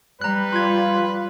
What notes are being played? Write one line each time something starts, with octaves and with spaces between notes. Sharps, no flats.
G3 B4 A#5 F#6
F4 C6 G#6